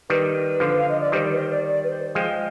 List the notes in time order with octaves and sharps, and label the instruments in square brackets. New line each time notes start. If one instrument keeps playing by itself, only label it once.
[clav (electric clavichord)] D#3 G3 [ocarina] B4
[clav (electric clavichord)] D3 F3
[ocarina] F5
D#5
D5
[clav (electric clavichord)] D#3 G3 [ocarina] C5
[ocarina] D5
B4
C5
D5
D5
B4
C5
[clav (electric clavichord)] F3 G#3 [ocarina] G5